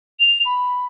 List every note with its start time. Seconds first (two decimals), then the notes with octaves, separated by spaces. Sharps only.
0.19 F7
0.45 B5